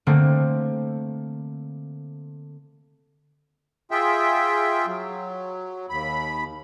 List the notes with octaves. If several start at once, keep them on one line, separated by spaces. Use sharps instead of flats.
D3 A3 A#3 C4
F4 G#4 E5 G5
F#3
D#2 B5